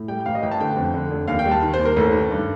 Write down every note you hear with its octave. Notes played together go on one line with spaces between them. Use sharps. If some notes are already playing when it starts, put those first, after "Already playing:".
Already playing: A2
G3 G5
G5
A1 F5
D#5
A1 G5
A5
D3 G5
F2
D3
F1
D#2 F5
G5
G3
A5
D#3
C5
D#2
A#4
A1 A4
D#3
G2